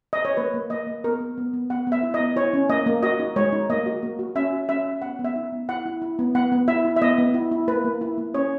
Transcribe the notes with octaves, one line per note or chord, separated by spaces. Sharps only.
D#5
C#5
A#3 B4
A#3
A#3 D#5
A#3
B3 A#4
B3
B3
B3
B3 F#5
B3 E5
E4
D#5
B3
E4 C#5
C#4
A#3 D#5
A#3
F#4 D#5
D#4
G#3 C#5
D#4
A#3 D#5
F#4
A#3
F#4
C#4 E5
F#4
C#4 E5
C#4
B3 F#5
B3
E5
D#4
B3
E4 F#5
E4
E4
B3
B3 F#5
B3
E4 E5
E4
E5
B3 D#5
B3
E4
E4
A#3 B4
A#3
E4
A#3
C#4 C#5